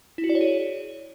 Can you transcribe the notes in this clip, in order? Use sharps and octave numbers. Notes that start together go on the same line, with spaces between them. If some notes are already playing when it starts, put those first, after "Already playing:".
E4
F#4
D5
C#5
G#4